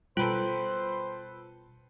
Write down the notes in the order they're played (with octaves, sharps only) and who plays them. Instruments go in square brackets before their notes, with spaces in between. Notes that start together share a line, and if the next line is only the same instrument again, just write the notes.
[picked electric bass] B2 G3 [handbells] F4 [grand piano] A4 B4 G5 [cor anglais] C5